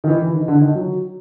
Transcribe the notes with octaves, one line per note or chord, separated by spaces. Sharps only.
D#3
E3
E3
D#3
D3
D#3
F#3